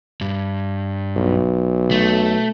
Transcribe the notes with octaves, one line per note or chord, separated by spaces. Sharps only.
G2
B1
A3